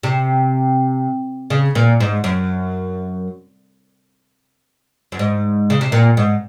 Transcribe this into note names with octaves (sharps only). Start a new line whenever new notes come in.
C3
C#3
A#2
G#2
F#2
F#2
G#2
C#3
C3
A#2
G#2